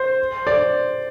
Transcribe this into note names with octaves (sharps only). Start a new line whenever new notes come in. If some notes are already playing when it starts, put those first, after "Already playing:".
Already playing: C5
D5